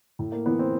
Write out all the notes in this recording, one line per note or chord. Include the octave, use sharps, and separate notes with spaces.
A2
A#3
E3 B3
C4